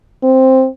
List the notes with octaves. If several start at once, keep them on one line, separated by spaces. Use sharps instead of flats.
C4